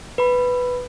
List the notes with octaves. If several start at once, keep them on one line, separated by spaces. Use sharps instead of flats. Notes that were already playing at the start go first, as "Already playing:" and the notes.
B4 B5